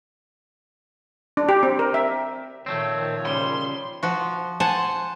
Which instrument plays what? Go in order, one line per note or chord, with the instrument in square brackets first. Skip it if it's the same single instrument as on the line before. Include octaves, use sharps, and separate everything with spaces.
[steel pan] D4
G4
C4
A#4
E5
[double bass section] A#2 D#3 F3 [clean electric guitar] A3 C4 [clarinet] C#5
[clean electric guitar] C#3 G3 [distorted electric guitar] C6
[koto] F3 F#4
C5 F#5 G#5 A5